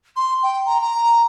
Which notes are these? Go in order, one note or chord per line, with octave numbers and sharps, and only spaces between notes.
C6
G5
A#5
A#5